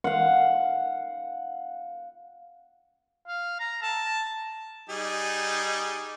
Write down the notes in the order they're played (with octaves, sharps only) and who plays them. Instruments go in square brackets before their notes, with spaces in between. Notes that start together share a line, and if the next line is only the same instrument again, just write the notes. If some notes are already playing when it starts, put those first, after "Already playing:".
[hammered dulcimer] F5 F#5
[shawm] F5
A#5
A5
[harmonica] G3 D#4 G#4